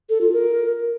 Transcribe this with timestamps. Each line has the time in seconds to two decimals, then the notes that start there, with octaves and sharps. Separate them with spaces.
0.10 A4
0.21 F4
0.33 A#4